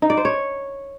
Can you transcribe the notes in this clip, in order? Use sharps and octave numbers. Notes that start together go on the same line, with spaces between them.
D#4
D5
C5
C#5